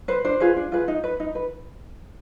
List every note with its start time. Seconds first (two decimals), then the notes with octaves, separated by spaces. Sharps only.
0.08 B4 C5
0.24 D4 C5
0.40 F4 G#4 B4
0.57 D4
0.72 F4 G#4 B4
0.88 D#4
1.04 B4
1.20 D#4
1.35 B4